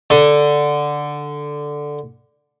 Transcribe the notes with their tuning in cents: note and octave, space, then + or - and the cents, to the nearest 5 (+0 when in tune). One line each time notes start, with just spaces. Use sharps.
D3 +0